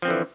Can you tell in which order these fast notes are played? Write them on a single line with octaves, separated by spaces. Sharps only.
F3 C4 D3 E3